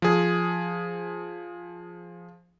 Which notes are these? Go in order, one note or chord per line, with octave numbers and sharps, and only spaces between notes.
F3 G#4